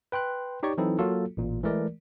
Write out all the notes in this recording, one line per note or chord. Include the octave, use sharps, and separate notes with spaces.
B4 G5 C6 F#6
D#4 G4 C#5 D5 C#6
E3 F#3 C4 D#4 E4 A4
F#3 A#3 F4 F#4 A4
A1 A#2
E3 G#3 A3 A#4 D5